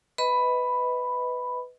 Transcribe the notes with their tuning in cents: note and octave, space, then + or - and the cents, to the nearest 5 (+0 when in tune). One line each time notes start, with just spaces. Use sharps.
B4 +10 D#5 +25 B5 +0